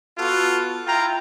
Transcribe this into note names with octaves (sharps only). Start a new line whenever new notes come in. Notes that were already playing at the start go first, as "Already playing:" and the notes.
B3 F4 F#4 A4
E4 F4 G5 A#5